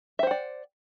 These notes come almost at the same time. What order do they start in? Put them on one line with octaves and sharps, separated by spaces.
E5 C5 F#5 D5